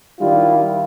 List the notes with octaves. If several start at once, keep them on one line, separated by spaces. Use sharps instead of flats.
D#3 G3 D4 E4 F4